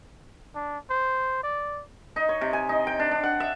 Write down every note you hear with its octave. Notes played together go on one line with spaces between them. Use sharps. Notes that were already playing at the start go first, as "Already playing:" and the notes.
D4
C5
D5
D#4
C#5
C3
G#5
D#4
G5
D4
D4
F#5
E5